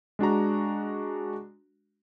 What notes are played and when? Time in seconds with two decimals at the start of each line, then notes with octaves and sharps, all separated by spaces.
0.19 G#3 D4 F#4 A#5